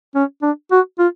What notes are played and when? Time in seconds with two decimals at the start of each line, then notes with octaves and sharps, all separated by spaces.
0.15 C#4
0.42 D4
0.72 F#4
0.99 F4